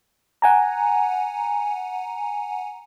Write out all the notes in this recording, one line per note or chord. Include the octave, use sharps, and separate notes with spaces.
F#5 G#5 A#5